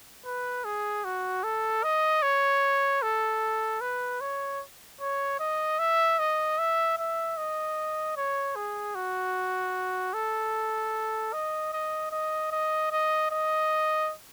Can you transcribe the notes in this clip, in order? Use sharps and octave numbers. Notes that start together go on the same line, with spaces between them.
B4
G#4
F#4
A4
D#5
C#5
A4
B4
C#5
C#5
D#5
E5
D#5
E5
E5
D#5
C#5
G#4
F#4
A4
D#5
D#5
D#5
D#5
D#5
D#5